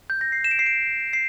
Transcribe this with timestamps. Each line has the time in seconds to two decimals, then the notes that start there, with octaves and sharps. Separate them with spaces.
0.10 G6
0.21 A#6
0.32 C7
0.44 E7
0.51 D7
0.59 C7
0.66 D7
1.13 C7